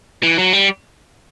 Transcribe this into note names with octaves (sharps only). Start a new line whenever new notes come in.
E3
F#3
G3